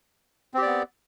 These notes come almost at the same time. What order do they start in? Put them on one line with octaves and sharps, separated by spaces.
C4 G4 D5 B3